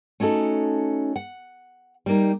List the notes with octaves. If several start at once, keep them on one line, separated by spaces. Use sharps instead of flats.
A3 C#4 D#4 F#4 A4
F#5
G3 A#3 D#4